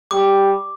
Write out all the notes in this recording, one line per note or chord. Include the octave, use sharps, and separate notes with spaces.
G3 D6